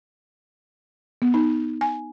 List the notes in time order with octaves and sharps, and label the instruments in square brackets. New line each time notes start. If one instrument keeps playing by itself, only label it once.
[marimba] B3
[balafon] D#4
G#5